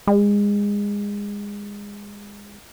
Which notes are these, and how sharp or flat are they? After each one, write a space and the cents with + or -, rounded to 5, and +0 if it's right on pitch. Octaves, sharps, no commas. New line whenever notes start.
G#3 -25